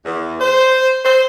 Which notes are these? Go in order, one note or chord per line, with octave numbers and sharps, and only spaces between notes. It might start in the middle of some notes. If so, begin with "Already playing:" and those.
E2
C5
C5